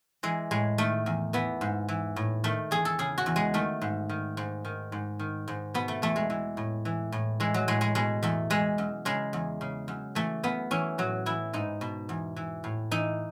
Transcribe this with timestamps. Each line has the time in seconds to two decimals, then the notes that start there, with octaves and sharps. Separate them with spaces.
0.23 E3 G#3
0.51 A2 G#3
0.78 D#3 A3
1.06 E2
1.33 E3 B3
1.61 G#2
1.89 E3
2.16 A2
2.44 D#3 A3
2.71 E2 G#4
2.85 A4
2.99 C#3 G#4
3.18 F#4
3.26 E2
3.36 G#3
3.54 D#3 A3
3.81 G#2
4.09 D#3
4.37 G#2
4.65 D#3
4.92 G#2
5.19 D#3
5.48 G#2
5.74 B2 B3
5.88 A3
6.02 E2 A3
6.16 G#3
6.30 E3
6.57 A2
6.85 E3
7.12 A2
7.40 E3 G#3
7.54 F#3
7.68 A2 G#3
7.81 G#3
7.95 B2 G#3
8.23 E2 A3
8.50 E3 G#3
8.78 F#2
9.05 C#3 G#3
9.33 E2
9.61 C#3
9.88 F#2
10.15 E3 A3
10.43 F#2 B3
10.71 E3 C#4
10.98 A2 F#3
11.26 E3 E4
11.53 G#2 D#4
11.81 B2
12.09 E2
12.36 E3
12.64 A2
12.91 E3 D#4